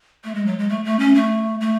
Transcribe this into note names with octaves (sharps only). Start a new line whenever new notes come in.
A3
G#3
F#3
G#3
A3
A3
C#4
A3
A3